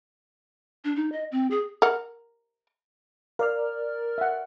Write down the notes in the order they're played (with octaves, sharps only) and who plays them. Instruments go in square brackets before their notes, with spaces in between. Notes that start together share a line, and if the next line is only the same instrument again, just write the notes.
[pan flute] D4
D#4
D#5
C4
G#4
[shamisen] A#4 F#5
[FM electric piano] A#4 D5 F6 [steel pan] F5
[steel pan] E5 F#5